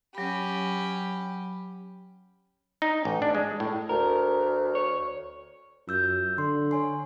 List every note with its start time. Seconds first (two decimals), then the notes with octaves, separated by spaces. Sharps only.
0.15 F#3 C#4 G4 B5
2.82 D#4
3.05 A1
3.22 D4
3.35 G#3
3.60 A2
3.89 D2 A#4
4.75 C#5
5.88 F#2 F4 E6 G6
6.38 D3 C6
6.71 C#5 G#5 C6